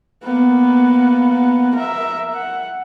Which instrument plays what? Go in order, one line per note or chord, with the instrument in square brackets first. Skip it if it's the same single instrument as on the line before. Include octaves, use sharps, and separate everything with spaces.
[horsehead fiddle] A#3 B3
A#4 E5
F#5